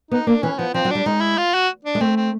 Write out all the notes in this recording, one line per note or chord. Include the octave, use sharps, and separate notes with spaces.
B3 D#4
A#3 D4
E3 C#4
F3 B3
F3 C4
F#3
G3 D4
G#3 D#4
E4
F4
F#4
D4
G#3
A3 C4
C4